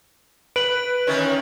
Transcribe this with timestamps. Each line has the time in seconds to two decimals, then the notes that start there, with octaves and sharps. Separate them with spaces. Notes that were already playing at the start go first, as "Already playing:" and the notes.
0.56 B4 D7 F#7
1.07 D#3 E3 C#4